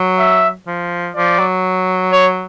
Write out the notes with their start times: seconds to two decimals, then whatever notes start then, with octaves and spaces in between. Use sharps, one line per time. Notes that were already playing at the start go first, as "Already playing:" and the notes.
Already playing: F#3
0.19 E5
0.67 F3
1.15 F3 D5
1.39 F#3
2.12 C#5